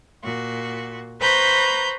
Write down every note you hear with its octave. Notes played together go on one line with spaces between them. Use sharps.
A#2 F#4
B4 C5 A#5 B5 C#6 G6